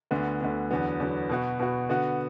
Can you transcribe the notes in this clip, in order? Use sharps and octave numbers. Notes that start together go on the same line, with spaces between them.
D2 D3 B3
D2 D3 B3
E2 D3 F#3 B3
E2 D3 F#3 B3
B2 B3 F#4
B2 B3 F#4
D3 B3 F#4